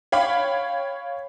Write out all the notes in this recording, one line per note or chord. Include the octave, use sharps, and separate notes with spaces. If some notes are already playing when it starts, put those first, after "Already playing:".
C#5 F5 G5 B5